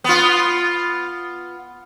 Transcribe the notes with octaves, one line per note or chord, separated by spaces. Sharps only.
B3 F4